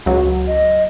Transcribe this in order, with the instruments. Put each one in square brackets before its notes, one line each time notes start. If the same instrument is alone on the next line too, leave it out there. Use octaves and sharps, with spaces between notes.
[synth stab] C#2 F#3
[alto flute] D#5